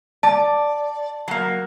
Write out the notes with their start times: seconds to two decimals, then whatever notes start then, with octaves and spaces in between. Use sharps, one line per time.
0.23 D5 A5
1.28 F#3 A#3